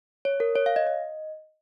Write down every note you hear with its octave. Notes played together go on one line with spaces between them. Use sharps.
C#5
A#4
C#5
F5
D#5
D#5